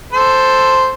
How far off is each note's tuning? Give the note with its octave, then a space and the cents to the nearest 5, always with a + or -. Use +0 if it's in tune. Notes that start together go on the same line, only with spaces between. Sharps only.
A4 +0 C5 +0